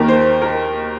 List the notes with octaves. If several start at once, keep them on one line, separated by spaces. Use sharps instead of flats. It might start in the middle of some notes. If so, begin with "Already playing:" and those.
Already playing: D#2 D#3 A#4
C5
A#4